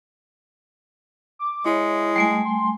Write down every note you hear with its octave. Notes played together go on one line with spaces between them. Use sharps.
D6
G#3 E4 C#5
G3 A3 G#5
C6